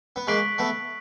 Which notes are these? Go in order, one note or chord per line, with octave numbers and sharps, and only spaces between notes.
B3
G#3 A#3 C#6 F#6 B6 D7 F#7
A3 B3